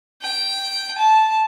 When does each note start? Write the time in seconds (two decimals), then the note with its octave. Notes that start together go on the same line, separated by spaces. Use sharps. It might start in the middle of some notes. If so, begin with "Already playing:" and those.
0.22 G5
0.98 A5